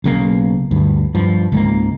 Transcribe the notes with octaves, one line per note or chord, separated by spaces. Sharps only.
B1 C#3 A#3
D2 G2
G2 F3
C#2 G#2 G#3 A#3